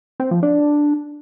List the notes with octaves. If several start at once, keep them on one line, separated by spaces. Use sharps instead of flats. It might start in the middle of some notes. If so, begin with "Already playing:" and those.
C4
F3
D4